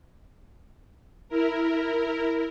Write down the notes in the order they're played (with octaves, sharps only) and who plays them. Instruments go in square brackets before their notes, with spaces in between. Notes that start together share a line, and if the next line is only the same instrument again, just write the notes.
[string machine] E4 A#4